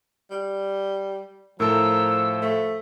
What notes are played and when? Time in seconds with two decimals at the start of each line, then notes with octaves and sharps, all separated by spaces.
0.31 G3
1.60 A2 F3 A4 A#4 E6
2.42 A3